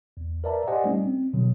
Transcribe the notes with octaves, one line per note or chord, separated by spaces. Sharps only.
E2
A#4 B4 D5 E5 A5 A#5
G4 C5 D5 D#5 F#5 G#5
G3 A3 C#4 D#4
C4
B2 D3 F#3